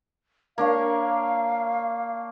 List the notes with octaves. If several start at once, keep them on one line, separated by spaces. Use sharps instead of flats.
A#3 D4 C#5 F5